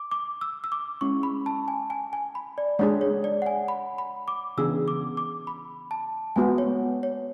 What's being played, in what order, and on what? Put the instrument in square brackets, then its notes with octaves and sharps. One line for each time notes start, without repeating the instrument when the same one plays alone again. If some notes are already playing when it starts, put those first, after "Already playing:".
Already playing: [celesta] D6
D6
E6
E6
D6
[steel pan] G#3 C#4 E4 [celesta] C#6
[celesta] B5
A5
G#5
G#5
G#5
B5
D5
[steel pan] G#3 D4 G#4 [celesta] C#5
[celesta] C#5
D5
F#5
G#5
B5
B5
D6
[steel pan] C#3 E3 B3 D4 G#4 [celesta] E6
[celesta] D6
D6
B5
A5
[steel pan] G#3 B3 F#4 [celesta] G#5
[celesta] C#5
C#5